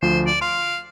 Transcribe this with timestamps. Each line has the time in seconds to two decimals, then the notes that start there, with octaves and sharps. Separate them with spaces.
0.02 D2 F3 C5
0.27 D5
0.41 F5 C6